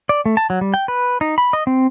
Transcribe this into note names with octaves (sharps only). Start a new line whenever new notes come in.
D5
A3
A5
F#3
G3
G5
B4
D#4
B5
D#5
C4